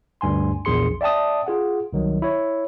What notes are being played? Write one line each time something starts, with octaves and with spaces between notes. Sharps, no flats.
D2 G2 G#5 C6
A#1 E2 G#4 C6 C#7
D5 E5 G5 A5 D#6
F4 G#4 F#5
C2 D#3 F#3
E4 C#5